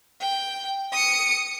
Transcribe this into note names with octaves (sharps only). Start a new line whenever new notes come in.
G5
D#6 C#7